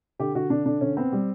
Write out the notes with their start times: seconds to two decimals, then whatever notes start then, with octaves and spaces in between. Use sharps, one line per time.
0.19 D3 G4
0.35 D3 F#4
0.50 D3 D4
0.66 D3 D4
0.81 D3 C#4
0.97 B3 C4
1.12 G3